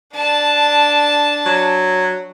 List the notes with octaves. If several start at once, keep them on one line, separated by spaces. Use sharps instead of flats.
D4 A5
F#3